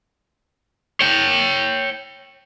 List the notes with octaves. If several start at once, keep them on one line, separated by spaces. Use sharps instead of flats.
C#5 G5